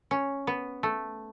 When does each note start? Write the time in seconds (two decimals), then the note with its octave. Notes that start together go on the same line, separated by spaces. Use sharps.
0.11 C#4
0.47 B3
0.83 A3